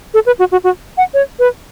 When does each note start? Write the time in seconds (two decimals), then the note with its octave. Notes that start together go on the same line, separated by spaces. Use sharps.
0.14 A4
0.26 B4
0.39 F#4
0.52 F#4
0.64 F#4
0.98 F#5
1.14 C#5
1.39 B4